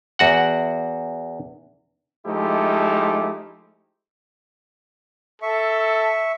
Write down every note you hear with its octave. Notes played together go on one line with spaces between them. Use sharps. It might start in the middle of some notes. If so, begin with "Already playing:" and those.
E2 F#4 F#5
F3 G#3 A3 D#4 E4 G4
A4 E5 C#6